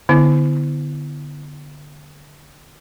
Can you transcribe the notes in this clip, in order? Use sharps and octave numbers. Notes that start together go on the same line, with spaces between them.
D3 B3 E4